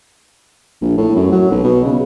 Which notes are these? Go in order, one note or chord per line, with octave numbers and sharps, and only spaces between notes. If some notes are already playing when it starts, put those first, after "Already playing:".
A#1
A2
F#2
F#3
B1
B2
C#3